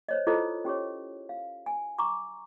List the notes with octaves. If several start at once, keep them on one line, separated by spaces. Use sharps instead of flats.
C5 C#5 D#5
E4 F4 G#4 A4 C5 D#5
C#4 G4 G#4 C#5
F5
G#5
A#5 C#6 D6